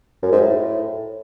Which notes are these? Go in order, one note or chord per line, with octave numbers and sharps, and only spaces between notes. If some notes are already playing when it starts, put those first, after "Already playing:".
F#2
G#2
A2